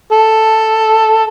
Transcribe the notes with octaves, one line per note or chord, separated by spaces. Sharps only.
A4